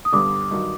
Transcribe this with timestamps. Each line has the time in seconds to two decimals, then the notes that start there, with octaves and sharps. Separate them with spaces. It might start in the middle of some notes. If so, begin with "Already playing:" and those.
0.05 D#6
0.12 G2 D3 G3 B3 D6
0.51 G2 D#3 F#3